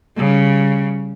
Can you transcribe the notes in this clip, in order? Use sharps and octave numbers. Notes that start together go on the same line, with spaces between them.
C#3 G3